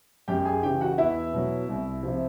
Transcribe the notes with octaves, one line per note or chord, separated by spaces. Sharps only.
F#2 G4 G5
G#4 G#5
C#3 E3 G4 G5
F#4 F#5
E2 E4 E5
B2 F#3
C2
C3 F3